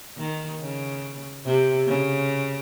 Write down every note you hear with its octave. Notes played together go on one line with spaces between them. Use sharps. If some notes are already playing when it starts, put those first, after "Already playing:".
D#3
C#3
C3
C#3